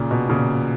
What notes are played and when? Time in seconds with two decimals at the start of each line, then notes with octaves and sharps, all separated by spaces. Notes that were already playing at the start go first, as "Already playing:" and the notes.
Already playing: A#2 C#3
0.11 B2
0.29 A#2 C#3